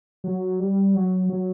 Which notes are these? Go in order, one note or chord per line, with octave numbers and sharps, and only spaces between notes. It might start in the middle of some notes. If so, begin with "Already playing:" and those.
F#3
G3
F#3
F#3